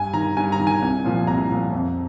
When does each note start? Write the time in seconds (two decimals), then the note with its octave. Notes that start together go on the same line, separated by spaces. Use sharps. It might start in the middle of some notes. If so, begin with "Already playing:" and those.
Already playing: G2 G#5
0.13 D#3 A#5
0.37 G2 G#5
0.52 A#5
0.60 D#3
0.67 G#5
0.82 C2
1.04 A#2 F3
1.27 C2 A#5
1.50 A#2 F3
1.72 F2